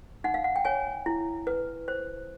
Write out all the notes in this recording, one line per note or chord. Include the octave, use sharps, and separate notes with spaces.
D#4 F#5
F5
F#5
G5
C#5 G#5
E4
B4
C5